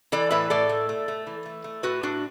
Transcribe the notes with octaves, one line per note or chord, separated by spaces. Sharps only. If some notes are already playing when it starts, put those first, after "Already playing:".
E3 A4 D5
A2 B4 E5
A2 A4 D5
A3
A3
A3
E3
A3
A3
A2 F#4 B4
A2 D4 F#4